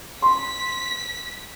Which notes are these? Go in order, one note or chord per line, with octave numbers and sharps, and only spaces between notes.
C6 B6